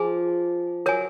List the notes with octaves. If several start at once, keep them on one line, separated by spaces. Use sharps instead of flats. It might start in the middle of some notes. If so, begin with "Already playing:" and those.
Already playing: F3 G#4 G#5
F#3 A#4 C#5 G#5